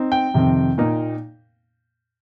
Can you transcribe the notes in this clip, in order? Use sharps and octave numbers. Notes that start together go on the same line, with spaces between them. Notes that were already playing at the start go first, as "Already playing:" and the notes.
Already playing: C4 D#4
G5
F2 C3 D#3 C4
A#2 A#3 D#4